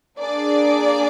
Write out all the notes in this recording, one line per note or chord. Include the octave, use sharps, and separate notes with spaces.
A#3 D4 G#4 D5